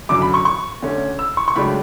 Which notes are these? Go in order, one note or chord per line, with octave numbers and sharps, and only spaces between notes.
F#2 D3 F#3 D6
B5
C#6
C#6
D2 D3 A3 C#4
E6
C#6
C#6
C#2 C#3 F#3 A3 D4 B5